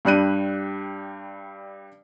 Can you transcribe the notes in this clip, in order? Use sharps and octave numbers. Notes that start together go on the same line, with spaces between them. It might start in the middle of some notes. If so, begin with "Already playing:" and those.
G2 G3 F#6 D#7